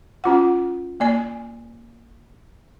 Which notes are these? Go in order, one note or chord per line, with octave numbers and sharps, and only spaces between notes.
C#4 F4 F#5
A#3 D5 G#5